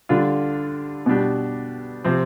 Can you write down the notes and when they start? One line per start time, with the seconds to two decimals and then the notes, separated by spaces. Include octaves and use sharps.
0.09 D3 G3 D4 F4
1.06 B2 G3 D4 G4
2.04 C3 F3 C4